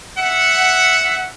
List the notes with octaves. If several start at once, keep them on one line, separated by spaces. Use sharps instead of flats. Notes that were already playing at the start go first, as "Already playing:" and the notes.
E5 F#5